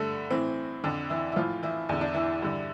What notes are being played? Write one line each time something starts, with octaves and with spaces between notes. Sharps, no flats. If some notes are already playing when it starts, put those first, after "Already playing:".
Already playing: G2 D3 A3 A4
A2 E3 C4
F2 D3 D4
E3 E4
E4
A2 E3 F3 F4
E3 E4
E2 D3 E4
D4
E3 E4
G2 D3